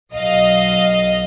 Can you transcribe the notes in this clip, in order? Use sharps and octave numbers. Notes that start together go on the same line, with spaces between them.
B1 D#5 F5